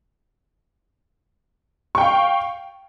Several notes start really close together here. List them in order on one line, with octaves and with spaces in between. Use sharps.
C#6 G5 F5